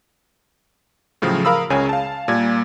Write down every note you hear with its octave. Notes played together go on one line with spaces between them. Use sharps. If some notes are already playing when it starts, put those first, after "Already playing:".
A2 C#3 F3 F#3
A#4 F5 B5 D#6 E6
C#2 C#3 C#4 G#5
F5 A5
A#2 G3 A#3 G#6